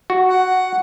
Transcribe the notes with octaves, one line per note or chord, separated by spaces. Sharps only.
F#4
F#5